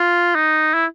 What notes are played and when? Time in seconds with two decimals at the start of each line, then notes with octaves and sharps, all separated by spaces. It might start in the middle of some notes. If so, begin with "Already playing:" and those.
Already playing: F4
0.35 D#4
0.74 E4